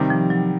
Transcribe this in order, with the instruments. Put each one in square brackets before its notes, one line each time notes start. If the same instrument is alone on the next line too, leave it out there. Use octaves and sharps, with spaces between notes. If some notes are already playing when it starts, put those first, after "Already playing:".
Already playing: [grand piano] C3 D#3 G3
[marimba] F3
F#3